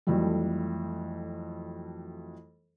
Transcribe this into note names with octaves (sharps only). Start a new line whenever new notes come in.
F2 E3 F#3 G3 A3